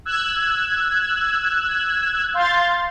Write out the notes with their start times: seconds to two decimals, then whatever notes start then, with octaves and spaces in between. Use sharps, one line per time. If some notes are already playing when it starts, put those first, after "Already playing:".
0.05 E6 F#6 G#6
2.34 F5 C6 G6 A6